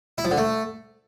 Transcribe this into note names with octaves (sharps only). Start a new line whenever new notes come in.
E4
F3
D3
A3